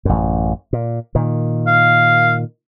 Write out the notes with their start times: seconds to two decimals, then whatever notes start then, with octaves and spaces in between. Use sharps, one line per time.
0.05 A1 F#2
0.73 A#2
1.15 A#2 D#3
1.67 F5